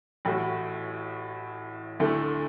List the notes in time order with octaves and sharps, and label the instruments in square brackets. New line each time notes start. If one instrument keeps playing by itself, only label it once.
[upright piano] A1 A2 A3 F#4
D2 D3 A3 E4 A4